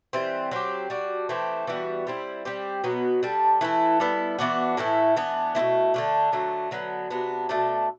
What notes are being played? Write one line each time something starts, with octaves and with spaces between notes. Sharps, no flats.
E3 G3 C4
F#3 C4 G4
G3 D4 F#4
E3 A3 C4 G4
E3 G3 B3 F#4
G3 C4 E4
G3 C4 G4
B2 F#3 B3
G3 D4 A4
E3 A3 E4
G3 B3 E4 A4
E3 B3 D4 F#4
A2 E3 A3 E4
E3 B3 D4
B2 A3 C4 E4
D3 A3 D4
D3 F#3 A3
D3 F#3 B3
C3 F#3 B3 D4
B2 A3 D4 A4